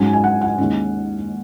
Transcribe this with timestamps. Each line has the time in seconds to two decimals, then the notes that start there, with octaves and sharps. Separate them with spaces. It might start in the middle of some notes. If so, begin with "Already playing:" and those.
Already playing: G#2 F#3 C#4 G#5
0.13 G#5
0.24 F#5
0.42 F#5
0.58 D#2 D#3 G#3 C#4